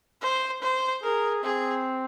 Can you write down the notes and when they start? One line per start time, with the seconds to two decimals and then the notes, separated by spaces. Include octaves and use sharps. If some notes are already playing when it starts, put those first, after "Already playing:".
0.22 C5
0.62 C5
1.03 G#4 A#4
1.44 C4 G#4